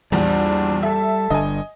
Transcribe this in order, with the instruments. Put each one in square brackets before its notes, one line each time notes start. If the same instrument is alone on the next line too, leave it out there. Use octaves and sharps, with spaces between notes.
[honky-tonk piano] A#1 E2 [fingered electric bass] G3 [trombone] D4
[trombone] A4 [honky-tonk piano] E5
[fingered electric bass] G1 G2 D3 [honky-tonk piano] D#5 G#5